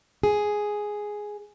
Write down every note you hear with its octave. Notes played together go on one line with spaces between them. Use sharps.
G#4